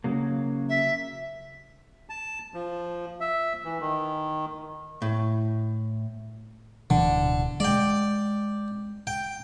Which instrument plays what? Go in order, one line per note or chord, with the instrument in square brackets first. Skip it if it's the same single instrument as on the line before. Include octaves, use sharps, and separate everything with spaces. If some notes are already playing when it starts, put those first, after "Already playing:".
[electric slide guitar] C#3 F#3 A#3
[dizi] E5
[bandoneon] A5
F3
E5
E3
D#3
[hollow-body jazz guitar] A2
[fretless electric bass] D1 B2 E3 [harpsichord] D3
[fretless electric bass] G#3 [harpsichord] D5 G5
[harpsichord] G5